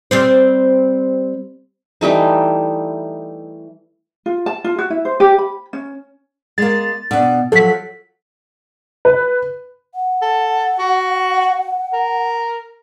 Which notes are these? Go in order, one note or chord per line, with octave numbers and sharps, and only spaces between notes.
G3 C4 C5
E3 G3 A3 D#4
F4
A5
F4
F#4
E4
C5
G4
B5
C#4
G#3 A#3 A6
B2 D4
F3 F#3 A4 B6
B4
F#5
A4
F#4
A#4